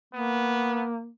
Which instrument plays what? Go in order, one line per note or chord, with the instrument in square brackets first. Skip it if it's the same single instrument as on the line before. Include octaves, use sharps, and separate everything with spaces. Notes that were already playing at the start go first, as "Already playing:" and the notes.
[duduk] A#3 [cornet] B3